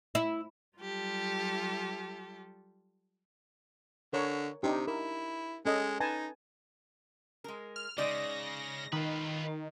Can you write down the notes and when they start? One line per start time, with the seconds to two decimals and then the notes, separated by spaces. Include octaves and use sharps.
0.15 E4
0.77 F#3 G3 F4 G4 A4
4.13 D3 A#4 C#5 C#6
4.63 C3 D4 D#4 G4
4.87 E4 A#4
5.65 G#3 C#4 A4 D#5
6.00 D#4 B4 G#5 A5
7.44 G#3 A#4
7.76 F6
7.98 C#3 G#3 D#4 D5 A#6
8.93 D#3 F4 B4